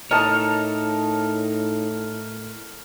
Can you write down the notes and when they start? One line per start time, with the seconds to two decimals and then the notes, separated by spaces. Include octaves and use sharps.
0.11 A2 D#4 A#4 C#5 D#5 A5